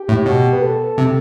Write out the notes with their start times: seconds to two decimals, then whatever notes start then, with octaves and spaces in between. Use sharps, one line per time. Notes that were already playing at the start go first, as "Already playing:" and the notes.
Already playing: G4
0.09 A2
0.26 B2
0.53 B4
0.62 A4
0.98 C3